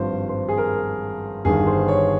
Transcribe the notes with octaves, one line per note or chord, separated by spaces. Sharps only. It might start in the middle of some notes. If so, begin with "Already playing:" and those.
Already playing: G#1 G2 F3 C5
C5
G#4
A#4
G1 G2 D#3 G#4
C5
C#5